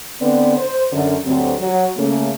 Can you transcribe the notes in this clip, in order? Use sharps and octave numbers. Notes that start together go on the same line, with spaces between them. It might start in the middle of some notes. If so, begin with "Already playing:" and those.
D3 B3 C4 B4 D5
C5
F#2 D3
D2 G2 D3 F#3 C4
F#3
C#3 A3 A#3